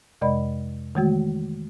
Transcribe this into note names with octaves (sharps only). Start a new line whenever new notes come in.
F2 C3 G#3 D5 D#5 B5
D#3 E3 G#3 A3 F#4